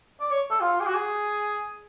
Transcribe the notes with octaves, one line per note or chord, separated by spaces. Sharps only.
D5
C#5
A4
F4
G#4
F#4
G#4